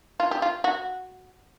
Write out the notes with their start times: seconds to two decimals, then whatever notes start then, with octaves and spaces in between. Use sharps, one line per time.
0.20 F4
0.31 G4
0.42 F4
0.64 F#4